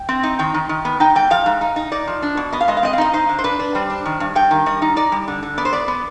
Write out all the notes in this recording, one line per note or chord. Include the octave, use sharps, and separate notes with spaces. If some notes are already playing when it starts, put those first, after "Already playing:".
Already playing: G5
C4
D#4
D#3 G5
D#3
D#3
B3
D#4 G5
G#2 G5
F3 F5
G#2
D#4
D#4
D#4 D5
F3
D4
B2
B3 D#5
F5
G#3 D#5
F5
C4 D#5
F5
D#4 D#5
D#4 C5
D3
C5
D4 B4
D4
G3 C5
D4
D#3
G2
G2 G5
D#3
G3 D#5
D#4
D#4 D5
G3
D3
D3
B3 D5
C5
B3 D5
B3